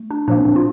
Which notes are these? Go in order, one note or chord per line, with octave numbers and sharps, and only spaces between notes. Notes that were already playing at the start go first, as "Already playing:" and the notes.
Already playing: A3
D4
A#2 F3 A#3 D4
C4
D4
F4